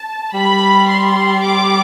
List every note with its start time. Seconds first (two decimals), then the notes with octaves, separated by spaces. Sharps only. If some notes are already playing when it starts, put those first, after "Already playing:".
Already playing: A5
0.34 G3 B5
0.89 C6
1.45 D6